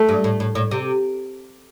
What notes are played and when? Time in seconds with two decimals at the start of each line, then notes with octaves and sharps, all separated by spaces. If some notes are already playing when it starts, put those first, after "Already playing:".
Already playing: A3
0.09 G2
0.24 A2
0.40 A2
0.55 A2
0.71 C3